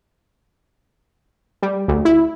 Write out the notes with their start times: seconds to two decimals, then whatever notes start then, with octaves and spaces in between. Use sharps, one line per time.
1.62 G3
1.88 D2
2.05 E4